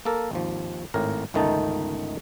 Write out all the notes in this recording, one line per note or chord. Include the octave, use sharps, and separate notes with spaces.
A#3 A4 A#4
G#1 D#2 F3
G#1 A2 A#4
G1 C#2 D#3 A3 D#4 A5